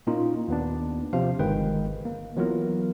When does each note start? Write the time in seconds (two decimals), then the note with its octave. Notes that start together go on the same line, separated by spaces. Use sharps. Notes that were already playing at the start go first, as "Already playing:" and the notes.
0.07 A#2 A#3 C#4 D#4 F4
0.48 D#2 B3 D4
1.13 C3 F3 F5
1.39 G1 D#3 G#3 B4 G5
2.05 A#3
2.36 E3 F#3 B3 F4 A#4